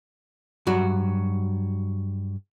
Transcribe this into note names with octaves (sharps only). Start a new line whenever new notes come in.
G2 F#3 F#4